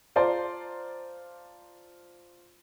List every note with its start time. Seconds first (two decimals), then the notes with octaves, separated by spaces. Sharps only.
0.16 F4 C5 D5 A5 A#5 C6